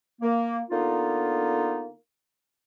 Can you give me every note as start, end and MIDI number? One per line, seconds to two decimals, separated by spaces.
0.22 0.59 58
0.70 1.91 50
0.70 1.91 58
0.70 1.91 59
0.70 1.91 63
0.70 1.91 65